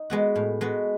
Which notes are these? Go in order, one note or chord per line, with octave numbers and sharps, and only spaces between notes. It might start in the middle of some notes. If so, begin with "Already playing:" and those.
Already playing: D#4
G#3 B3 F#4
A2
G#3 B3 F#4